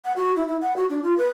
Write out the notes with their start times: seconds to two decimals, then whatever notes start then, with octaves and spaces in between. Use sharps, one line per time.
0.05 F#5
0.16 F#4
0.36 E4
0.48 E4
0.61 F#5
0.76 F#4
0.90 D4
1.03 F4
1.18 B4